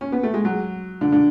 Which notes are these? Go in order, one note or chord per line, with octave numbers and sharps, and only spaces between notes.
C#4
B3
A3
G#3
F#3
D3
D3